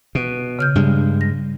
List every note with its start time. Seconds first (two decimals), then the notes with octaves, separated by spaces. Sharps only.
0.15 B2
0.59 C#3 F6 G6
0.76 G2 G#3
1.21 A#6